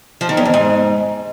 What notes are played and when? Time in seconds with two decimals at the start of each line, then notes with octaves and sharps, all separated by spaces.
0.21 F3
0.29 D#3
0.37 E2
0.45 F2
0.54 G#2